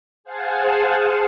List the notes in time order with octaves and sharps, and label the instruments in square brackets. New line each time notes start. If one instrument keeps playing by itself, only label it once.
[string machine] G#4 C5 F5 F#5 G#5 A5